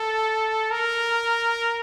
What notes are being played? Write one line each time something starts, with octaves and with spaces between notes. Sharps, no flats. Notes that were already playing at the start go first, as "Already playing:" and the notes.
Already playing: A4
A#4